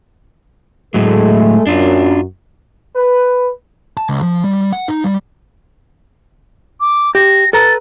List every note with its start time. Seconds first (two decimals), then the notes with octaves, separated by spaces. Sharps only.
0.94 A2 F#3 G#3 A3 A4
1.67 F#2 D4 F4
2.96 B4
3.97 A5
4.09 C#2
4.22 F3
4.45 G3
4.73 F#5
4.88 D#4
5.04 G3
6.81 D6
7.15 G4 A#6
7.53 A4 B4 A#5 A6